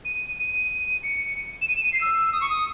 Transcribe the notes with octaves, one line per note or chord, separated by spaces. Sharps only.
D#7
D#7
C#7
E7
D#7
E7
D#7
C7
E6
D#6
C#6
D#6